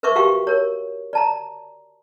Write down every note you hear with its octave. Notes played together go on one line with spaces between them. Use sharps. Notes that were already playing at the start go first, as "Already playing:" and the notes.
A#4 B4 E5 C#6 D6
F#4 G4 F5 G5 C#6
A#4 C#5
D5 A5 A#5